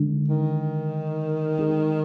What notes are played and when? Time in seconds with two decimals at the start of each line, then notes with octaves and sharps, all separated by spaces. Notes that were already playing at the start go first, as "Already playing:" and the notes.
Already playing: D3 G#3 D4
0.28 D#3
1.58 G#3 D#4 G#4